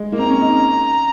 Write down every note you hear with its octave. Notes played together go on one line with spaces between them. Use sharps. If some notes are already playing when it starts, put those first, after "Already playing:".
Already playing: G#3
A#3
C4 A#5
C#4
D#4
C#4